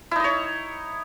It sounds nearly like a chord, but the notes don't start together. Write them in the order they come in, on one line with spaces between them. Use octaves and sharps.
E4 D#4 D#5 C#5